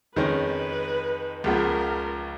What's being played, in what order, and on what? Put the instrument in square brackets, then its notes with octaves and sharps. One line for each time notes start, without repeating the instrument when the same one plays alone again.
[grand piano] F2 D#3 G#3 C#4 [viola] B4
[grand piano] C#2 C#3 F3 B3 [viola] A#4